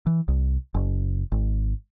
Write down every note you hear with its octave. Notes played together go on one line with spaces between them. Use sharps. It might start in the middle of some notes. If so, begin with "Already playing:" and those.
E3
C2
F#1
G#1